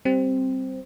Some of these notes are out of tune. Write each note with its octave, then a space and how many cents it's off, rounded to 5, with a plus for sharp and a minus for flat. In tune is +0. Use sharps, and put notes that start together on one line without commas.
G3 -10 C4 +0